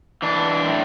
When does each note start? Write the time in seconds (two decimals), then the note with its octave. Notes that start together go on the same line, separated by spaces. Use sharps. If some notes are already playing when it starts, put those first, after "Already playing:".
0.22 E3 D4
0.67 A2